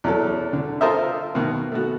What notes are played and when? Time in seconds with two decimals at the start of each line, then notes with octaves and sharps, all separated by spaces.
0.04 E2 F#3 A4
0.53 D3
0.81 F4 A4 A#4 C5 D#5 E5
1.35 B2 D#3
1.72 A3 B3 F#4